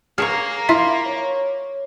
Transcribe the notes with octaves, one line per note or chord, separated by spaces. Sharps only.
A#3 G#4 C#5 F6
E4 F4 E5 B6
C#5